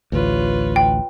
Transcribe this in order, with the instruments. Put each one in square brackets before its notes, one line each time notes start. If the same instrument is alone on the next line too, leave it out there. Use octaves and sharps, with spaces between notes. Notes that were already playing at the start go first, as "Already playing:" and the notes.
[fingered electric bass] A1 D2 [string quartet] F4 B4 C#5
[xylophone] G5